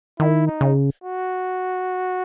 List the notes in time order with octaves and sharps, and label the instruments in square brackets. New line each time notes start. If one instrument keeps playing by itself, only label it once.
[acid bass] D#3 [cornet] E4
[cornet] D#4
[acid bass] C#3
[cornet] F#4